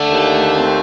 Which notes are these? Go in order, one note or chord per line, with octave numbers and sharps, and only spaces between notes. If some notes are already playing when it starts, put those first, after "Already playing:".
Already playing: D3 A3
D#2
C4